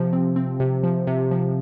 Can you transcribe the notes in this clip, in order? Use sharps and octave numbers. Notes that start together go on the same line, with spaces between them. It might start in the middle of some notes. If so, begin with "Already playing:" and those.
Already playing: C3 F3
C4
C4
C3
F3
C3
F3